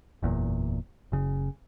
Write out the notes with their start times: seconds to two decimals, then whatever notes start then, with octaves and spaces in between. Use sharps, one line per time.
0.22 F#1 E2 A#2
1.12 F#1 C#3